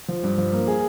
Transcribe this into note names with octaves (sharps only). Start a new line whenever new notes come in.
F3
G2
F3
A#3
G#4